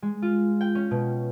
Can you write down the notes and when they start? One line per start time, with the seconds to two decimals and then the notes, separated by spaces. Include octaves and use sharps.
0.02 G#3
0.22 F4
0.61 G5
0.75 C#4
0.91 B2